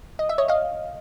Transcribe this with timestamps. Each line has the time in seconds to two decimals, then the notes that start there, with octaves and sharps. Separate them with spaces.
0.19 D#5
0.29 E5
0.38 C#5 D#5
0.48 D#5 F5